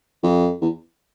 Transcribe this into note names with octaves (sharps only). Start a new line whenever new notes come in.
F2
E2